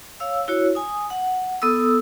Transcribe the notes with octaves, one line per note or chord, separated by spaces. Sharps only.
C#5 F5 E6
E4 F#4 C#5
G#5 D#6
F#5
B3 A4 D#6 E6